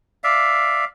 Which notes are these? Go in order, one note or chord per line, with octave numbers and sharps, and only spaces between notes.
D5 E5 F5